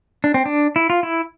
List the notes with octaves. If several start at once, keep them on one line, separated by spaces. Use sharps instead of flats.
D4
C4
D4
E4
F4
E4